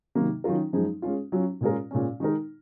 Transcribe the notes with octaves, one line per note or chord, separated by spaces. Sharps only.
C3 D#3 F#3 A#3
D#3 F#3 C#4 F4 A#4
F#2 F3 G#3 D#4 G#4
G#3 C#4 F4
F#3 C#4 F4
A#2 G#3 C#4 F4 A#4
A#2 G#3 C#4
D#3 G#3 D#4 A#4